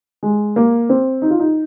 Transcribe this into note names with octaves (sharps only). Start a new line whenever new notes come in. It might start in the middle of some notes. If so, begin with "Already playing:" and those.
G#3
A#3
C4
D#4
F4
D#4